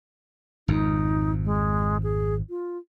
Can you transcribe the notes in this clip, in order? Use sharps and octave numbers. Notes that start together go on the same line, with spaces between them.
G#1 F2 D#4
G#3
G#4
F4